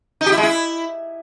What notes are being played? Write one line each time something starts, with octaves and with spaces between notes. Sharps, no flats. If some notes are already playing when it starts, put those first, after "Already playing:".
D#4
G4
E4
G#3
E4